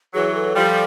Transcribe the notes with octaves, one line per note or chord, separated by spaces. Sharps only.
E3 F#3 G#4
A4
F3 G3